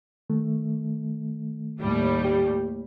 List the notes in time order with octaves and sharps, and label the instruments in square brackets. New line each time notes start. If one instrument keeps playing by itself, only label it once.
[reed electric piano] D#3 A3
[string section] D#2 A2 G3
[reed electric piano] G4